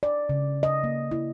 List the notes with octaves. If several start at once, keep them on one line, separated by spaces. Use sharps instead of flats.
D5
C#3
D#5
A#3
E4